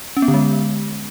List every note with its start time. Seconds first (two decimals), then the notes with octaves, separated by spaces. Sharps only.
0.17 C#4
0.22 B3
0.28 D3
0.34 G#3